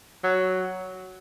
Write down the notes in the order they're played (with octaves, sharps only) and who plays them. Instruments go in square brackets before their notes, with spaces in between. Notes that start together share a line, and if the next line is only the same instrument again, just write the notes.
[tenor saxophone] F#3